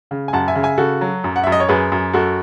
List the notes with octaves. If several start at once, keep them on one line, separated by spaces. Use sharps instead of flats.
C#3
G#5
F#2 F#5 A5
E5 G#5
C#3
E5 G#5
C#3 F#4 A4
F#3
F#2
F#5
F#2 E5
D#5
C#5
F#2 G#4 B4
F#2
F#2 F#4 A4